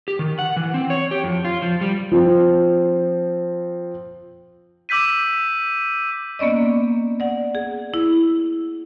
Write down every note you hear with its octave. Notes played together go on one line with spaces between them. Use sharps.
G4
D#3
F#5
E3
C4
C#5
G4
F2
F4
F3
G3
F3 C4
D6 E6 G6 B6 D#7
A#3 B3 C#4 D5 D#5
D5 F#5
G#4
E4